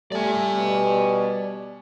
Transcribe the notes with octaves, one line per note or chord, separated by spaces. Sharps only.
G3 A3 D5 G#5
B2